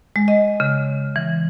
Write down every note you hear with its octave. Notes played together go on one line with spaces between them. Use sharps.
G#3
D#5
C#3
E3